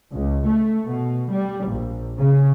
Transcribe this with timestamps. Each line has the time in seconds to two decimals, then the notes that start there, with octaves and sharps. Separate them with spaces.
0.11 C#2
0.46 A3
0.85 B2
1.31 G3
1.66 A#1
2.18 C#3